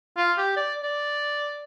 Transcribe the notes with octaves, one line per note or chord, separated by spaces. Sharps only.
F4
G4
D5
D5